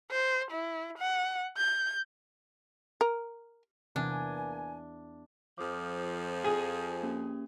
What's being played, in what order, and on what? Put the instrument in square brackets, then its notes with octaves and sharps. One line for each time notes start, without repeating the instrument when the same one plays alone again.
[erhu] C5
E4
F#5
G6
[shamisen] A#4
[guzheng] E2 [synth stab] C3 [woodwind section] A#3 B4 G#5 [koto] D4
[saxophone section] F2 F3 [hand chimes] D6 D#6 F6
[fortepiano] G#4
[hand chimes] A#3 C#4 G4